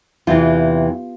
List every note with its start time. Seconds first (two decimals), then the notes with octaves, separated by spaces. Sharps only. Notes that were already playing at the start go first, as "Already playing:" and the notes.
0.27 E2 C3 E3 F4